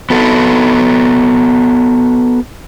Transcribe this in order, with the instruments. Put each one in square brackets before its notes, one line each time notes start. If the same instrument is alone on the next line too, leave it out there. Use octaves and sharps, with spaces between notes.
[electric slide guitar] B3 F#4 A4